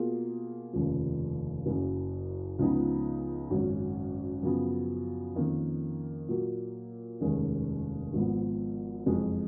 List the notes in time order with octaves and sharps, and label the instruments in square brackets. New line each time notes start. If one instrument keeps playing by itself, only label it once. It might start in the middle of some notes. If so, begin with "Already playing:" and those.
Already playing: [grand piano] B2 A#3 F4 G#4
F1 D#2 C#3 F3
F#1 F#2 C#3
C#2 C#3 F3 B3 D#4
G#1 F#2 C#3 F#3 C#4
F#2 C#3 F3 B3
F2 D#3 A#3 C#4
A#2 F#3 A#3
F1 D#2 D#3 G#3 C#4
G#1 G#2 F3 B3
F#1 F2 F3 G#3